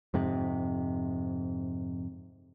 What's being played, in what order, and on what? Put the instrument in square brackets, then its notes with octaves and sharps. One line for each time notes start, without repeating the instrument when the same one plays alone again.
[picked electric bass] F2 G#2 C3